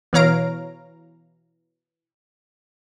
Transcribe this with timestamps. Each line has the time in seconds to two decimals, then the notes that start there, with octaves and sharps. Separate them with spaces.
0.13 B2 E3 C#5 F5 A#5 D7